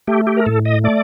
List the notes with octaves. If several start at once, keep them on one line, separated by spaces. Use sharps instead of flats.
A3 G4
G4
A#4
A2 A4
D#5
A3 D5